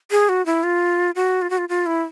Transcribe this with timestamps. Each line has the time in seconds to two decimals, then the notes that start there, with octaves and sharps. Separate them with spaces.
0.11 G#4
0.29 F#4
0.46 E4
0.63 F4
1.15 F#4
1.42 F4
1.50 F#4
1.58 F4
1.69 F4
1.86 E4